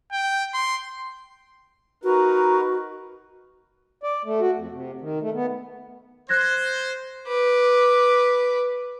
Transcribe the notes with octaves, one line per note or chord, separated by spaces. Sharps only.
G5
C6
D#4 F#4 A#4 B4
D5
A3
F#4
F2
C3
D#3
A3
B3
C5 F#6 G#6 A#6
B4 D6